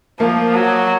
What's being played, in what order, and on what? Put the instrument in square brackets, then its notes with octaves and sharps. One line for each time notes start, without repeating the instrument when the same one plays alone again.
[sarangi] F3 [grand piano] A#3
[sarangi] F#3